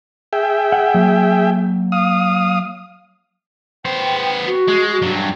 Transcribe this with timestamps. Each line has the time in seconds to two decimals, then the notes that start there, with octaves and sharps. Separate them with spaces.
0.33 G#4 E5 G5
0.72 F#5
0.94 F#3 A#3
1.92 F5 D#6
3.85 B3 C5 G5
4.47 F#4
4.68 G#3
5.02 G2 F#3